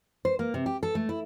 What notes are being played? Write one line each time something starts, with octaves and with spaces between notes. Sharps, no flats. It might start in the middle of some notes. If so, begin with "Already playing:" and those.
C5
A#3
C3
G4
A4
A3
E4